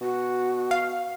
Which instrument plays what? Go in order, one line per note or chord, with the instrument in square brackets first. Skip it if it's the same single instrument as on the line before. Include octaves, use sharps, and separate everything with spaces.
[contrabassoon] B2 [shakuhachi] F#4
[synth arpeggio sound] F5